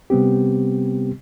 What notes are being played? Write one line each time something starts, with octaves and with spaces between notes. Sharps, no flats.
C3 G3 B3 C4 G4